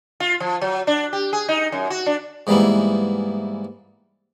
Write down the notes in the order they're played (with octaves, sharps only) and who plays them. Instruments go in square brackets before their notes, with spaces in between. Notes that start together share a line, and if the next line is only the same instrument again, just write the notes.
[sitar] F4
F3
F#3
D4
G4
G#4
D#4
F#2
F#4
D4
[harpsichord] G#2 E3 G3 A#3 B3 E4